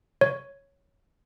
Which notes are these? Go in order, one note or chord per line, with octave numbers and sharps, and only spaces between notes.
C#5